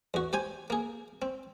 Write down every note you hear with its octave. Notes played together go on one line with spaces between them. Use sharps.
E2 F#4
G4 C5 G#5
A#3 G#4
C4